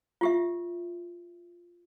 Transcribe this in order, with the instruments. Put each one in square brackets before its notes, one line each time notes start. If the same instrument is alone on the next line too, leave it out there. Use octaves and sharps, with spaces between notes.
[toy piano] F4 G4 E5